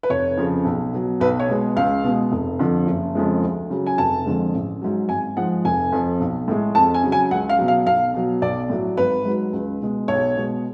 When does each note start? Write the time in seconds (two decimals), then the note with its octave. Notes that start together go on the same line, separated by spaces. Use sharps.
0.03 B4
0.10 F1 C#5
0.37 F2 C#3 F3
0.65 B1
0.93 B2 F#3
1.21 B1 B4
1.40 C#5
1.49 B2 G#3
1.76 C#2 F5
2.04 B2 G#3
2.32 F1
2.59 F2 D3 F3
2.87 F#1
3.15 F2 C#3 F3 G#3
3.43 D2
3.70 C#3 F#3
3.86 G#5
3.98 F1 A5
4.26 F2 D3 F3 G#3
4.54 A1
4.82 G#2 F#3
5.09 G#1 G#5
5.37 G#2 F3 G#3 F#5
5.65 F1 G#5
5.92 F2 F3
6.20 B1
6.48 A2 G#3
6.75 F2 A5
6.94 G#5
7.03 C#3 F#3
7.12 G#5
7.31 C#2 F#5
7.49 F5
7.59 B2 F#3
7.68 F5
7.86 B1 F5
8.14 B2 F#3
8.42 B1 D5
8.70 A2 F#3
8.97 G#1 B4
9.25 G#2 F#3
9.53 C#2
9.81 B2 G#3
10.08 B1 C#5
10.36 B2 G#3